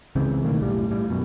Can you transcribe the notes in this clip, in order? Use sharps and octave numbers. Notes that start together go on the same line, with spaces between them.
C#2 C#3 E3 C4
B2 D#3 A3 A#3
F1 B1 A2 G3
A2 G3
F#2 B2